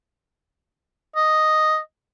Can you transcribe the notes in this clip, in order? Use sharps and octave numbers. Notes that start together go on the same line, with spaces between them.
D#5